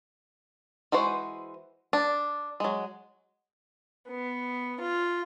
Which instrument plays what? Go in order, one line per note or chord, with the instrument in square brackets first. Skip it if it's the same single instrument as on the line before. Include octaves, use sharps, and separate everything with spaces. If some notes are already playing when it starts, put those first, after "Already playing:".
[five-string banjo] E3 G#3 F#4 C5
D4
F#3 G#3
[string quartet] B3
F4